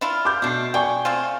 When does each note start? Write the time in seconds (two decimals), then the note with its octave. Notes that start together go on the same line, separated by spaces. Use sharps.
0.01 D4 E4 F4
0.25 D6 G6
0.42 B2 A3 D4 C7
0.74 D5 G5 G#5 C#6
1.05 A3 C4 F4